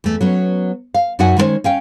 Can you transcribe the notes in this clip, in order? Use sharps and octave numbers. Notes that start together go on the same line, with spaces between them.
E2 A3
F#3 B3 C#4
F5
F#2 D#4 F#4 E5 F#5 G#5
D#3 G#3 B3 C#4 C5
C#4 F5 G5